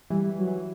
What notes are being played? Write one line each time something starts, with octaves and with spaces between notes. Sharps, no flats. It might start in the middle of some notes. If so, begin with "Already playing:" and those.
E3 G3
E3
F#3
E3